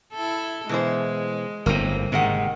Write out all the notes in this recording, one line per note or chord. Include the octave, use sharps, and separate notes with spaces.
E4 A4
B2 E3 G#3 C5
G1 A2 A#3 C4
G#2 C3 D#3 A#3 F#5